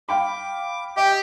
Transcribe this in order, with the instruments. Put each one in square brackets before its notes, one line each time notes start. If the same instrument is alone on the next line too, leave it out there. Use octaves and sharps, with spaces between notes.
[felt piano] F5 G5 B5 [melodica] D6
[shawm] G4 [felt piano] D#5 [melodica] G5 D6